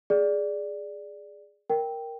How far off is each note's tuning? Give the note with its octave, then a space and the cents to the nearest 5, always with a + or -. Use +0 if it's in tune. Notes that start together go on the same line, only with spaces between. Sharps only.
G#4 +0 D5 +0
A#4 +0 G5 +0